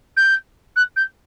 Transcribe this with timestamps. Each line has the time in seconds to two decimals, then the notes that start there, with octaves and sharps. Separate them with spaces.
0.17 G6
0.76 F#6
0.96 G6